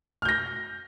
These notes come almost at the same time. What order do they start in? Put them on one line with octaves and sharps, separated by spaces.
F6 G6 A#6